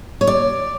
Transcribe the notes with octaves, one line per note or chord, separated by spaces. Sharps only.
C#5
D5